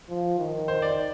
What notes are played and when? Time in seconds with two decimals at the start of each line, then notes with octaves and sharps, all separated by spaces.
0.09 F3
0.39 D#3
0.68 C5
0.82 D5